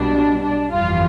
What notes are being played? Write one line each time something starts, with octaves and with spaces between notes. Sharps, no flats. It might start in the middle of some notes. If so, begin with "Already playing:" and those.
Already playing: B1 B2 G3 D4
D4
G1 F2 E3 G3 F4